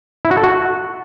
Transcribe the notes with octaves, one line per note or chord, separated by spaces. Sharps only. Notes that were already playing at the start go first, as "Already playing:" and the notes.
E4
F#4
A4
F#4